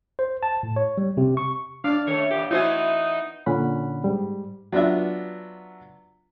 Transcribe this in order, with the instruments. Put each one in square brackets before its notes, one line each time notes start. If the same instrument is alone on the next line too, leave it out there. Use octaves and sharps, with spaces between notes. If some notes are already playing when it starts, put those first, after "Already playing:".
[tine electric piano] C5
A5
A2
C#5
G3
C3
C#6
[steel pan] D4 [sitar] D5 [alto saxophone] F5
[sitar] D#3 A3 C#4 [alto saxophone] C#5
[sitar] A#2 E3 [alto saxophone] G4
[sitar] E3 B3 C5 [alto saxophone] D#4 [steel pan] E4 F#4 G#5
[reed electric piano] A#2 D3 C#4 F#5 B5
G#2 G3
[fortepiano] F#3 B3 D4 F4 E5